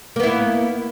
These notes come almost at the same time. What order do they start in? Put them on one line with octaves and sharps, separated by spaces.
A#3 B3 E4